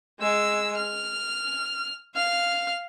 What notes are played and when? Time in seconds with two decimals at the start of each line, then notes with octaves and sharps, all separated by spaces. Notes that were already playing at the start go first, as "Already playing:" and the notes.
0.20 G#3 E6
0.77 F6
2.15 F5 F6